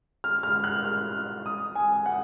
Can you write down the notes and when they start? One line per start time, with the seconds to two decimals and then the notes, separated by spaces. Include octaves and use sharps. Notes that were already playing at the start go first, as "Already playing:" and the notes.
0.24 F6
0.43 F6
0.64 F#6
0.85 F6
1.46 D#6
1.75 G#5
2.06 F#5